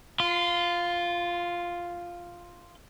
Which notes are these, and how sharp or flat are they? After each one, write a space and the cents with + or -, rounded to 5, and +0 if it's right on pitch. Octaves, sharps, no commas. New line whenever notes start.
F4 +0 C6 -25